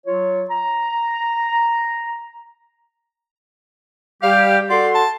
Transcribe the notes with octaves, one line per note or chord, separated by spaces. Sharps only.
F#3 F4 C#5
A#5
G3 G4 F5
F#4 A4 D5 C6
A5